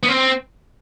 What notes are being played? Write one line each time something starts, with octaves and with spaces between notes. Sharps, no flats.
B3
C4